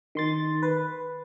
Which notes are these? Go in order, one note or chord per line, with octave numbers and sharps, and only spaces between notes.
D#3 C6 A6
B4